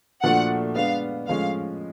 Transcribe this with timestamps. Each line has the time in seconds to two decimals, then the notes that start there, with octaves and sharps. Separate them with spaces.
0.22 A#2 F3 A3 D4 F#4 F#5
0.75 G#3 B3 D4 F5
1.28 A2 F3 G#3 C#4 F5